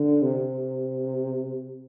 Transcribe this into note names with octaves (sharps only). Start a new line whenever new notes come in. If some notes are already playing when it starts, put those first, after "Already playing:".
Already playing: D3
C3